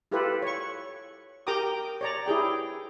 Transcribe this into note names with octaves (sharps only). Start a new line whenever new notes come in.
E4 F4 G4 A4 B4
C#5 C#6
G4 A#4 G5 A#5 D6 D#6
C#5 D5 A#5
E4 G4 G#4 G5